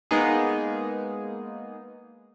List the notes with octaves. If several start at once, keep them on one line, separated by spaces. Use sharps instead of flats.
G#3 A#3 B3 D#4 G#4